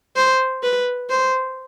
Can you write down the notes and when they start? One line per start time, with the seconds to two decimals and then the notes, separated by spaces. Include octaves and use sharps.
0.16 C5
0.63 B4
1.10 C5